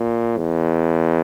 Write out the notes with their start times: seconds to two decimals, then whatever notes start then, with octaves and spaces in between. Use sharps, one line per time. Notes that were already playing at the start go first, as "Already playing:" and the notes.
Already playing: A#2
0.37 E2